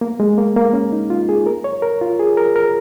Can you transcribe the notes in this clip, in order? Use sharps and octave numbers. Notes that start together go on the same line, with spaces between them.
A#3
G#3
A#3
A#3
C#4
D#4
F4
G#4
A#4
C#5
A#4
F4
G#4
A#4
A#4